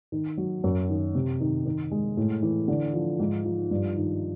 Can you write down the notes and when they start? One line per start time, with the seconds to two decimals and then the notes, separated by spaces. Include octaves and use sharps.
0.12 D#3
0.37 F#3
0.64 F#2
0.89 D#3
1.15 C3
1.41 D#3
1.66 D#3
1.91 G#3
2.17 A2
2.42 E3
2.68 D3
2.94 F3
3.19 G#2
3.45 F3
3.71 G2
3.96 D#3